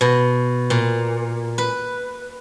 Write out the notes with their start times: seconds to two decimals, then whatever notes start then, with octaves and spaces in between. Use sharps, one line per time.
0.01 B2
0.70 A#2
1.58 B4